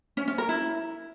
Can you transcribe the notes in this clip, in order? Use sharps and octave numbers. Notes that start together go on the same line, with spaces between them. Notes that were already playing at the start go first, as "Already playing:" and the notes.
C#4
C#4
A#4
E4